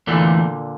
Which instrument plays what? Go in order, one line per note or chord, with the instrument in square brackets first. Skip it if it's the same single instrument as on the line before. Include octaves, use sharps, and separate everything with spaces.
[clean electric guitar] E2 E3 A3 [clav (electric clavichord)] A#2 D3